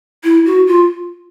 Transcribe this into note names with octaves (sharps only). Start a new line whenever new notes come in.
E4
F#4
F4